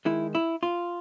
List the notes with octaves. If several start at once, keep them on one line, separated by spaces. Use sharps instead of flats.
D#3 G#3 E4
E4
F4